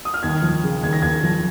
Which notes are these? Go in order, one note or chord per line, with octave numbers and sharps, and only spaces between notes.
D#6
F6
D#2 G#6
F3
C#3
D#2 G#6
A#6
D#2 G#6
F3